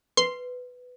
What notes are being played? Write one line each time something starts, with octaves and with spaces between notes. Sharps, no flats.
B4 C6